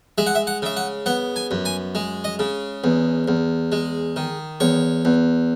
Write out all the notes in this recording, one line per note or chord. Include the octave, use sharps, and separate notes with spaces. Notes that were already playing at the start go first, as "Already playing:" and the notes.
G#3 E5
F#5
E5
F#5
C#3 E5
F#5
B3 F#5
G#5
F#2
G#5
G#3
D#5
C#3
E2
E2
G#3
D#3
E2 C#5
E2